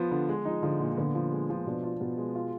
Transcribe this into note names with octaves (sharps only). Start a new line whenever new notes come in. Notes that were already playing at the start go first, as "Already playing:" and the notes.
Already playing: F3 B3 F4
D3
G#3
F3 D#4
D3 F3
A#2
D3 B3
F3
G#3
F3
B2 D4
F4
B2 B3
G#3
F4